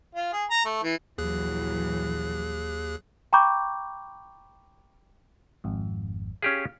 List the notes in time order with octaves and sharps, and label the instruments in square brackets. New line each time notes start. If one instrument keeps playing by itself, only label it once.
[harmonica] F4
G#4
A#5
A3
E3
[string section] A#1 E3 F#3 [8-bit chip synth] D#2 G#4 F#6
[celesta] G5 A#5 B5 C#6 D6 G6
[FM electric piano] G#1 F2
[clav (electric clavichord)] C#4 G4 G#4 [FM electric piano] F5